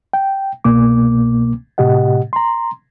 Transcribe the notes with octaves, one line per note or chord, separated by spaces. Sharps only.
G5
C2 B2 A#3 D6
A2 C3 G4 D#5 F#5
A#5 C6